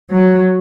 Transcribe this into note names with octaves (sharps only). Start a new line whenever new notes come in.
F#3